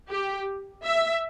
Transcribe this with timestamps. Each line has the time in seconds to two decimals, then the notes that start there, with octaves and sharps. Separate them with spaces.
0.09 G4
0.85 E5